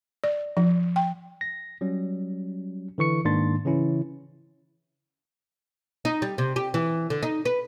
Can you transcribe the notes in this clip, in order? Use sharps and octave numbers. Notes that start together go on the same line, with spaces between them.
D5
F3
G5
A#6
F#3 G3 C#4
D3 E3 C#6 C#7
G#2 D#3 A#3 D4 C6 A6
C#3 E3 C#4 E4
D#4
G3
C3
G4
E3
D3
D#4
B4